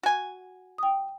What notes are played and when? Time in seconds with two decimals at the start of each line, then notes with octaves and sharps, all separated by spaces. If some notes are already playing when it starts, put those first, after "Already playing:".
0.03 F#4 G#5
0.78 G5 D#6